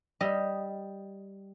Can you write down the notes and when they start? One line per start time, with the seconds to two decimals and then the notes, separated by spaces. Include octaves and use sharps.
0.21 G3 D#5